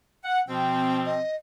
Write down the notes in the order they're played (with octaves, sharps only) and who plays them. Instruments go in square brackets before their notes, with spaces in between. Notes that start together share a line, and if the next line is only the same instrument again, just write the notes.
[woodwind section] F#5
[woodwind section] B2 F3 C4 [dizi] G5
[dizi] D#5